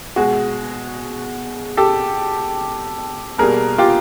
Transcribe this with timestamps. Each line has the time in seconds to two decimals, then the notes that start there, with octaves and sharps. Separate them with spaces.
0.16 B2 G#3 F#4 G#4
1.77 G4 A4
3.38 B2 G3 A#3 G#4 A#4
3.78 F4 G4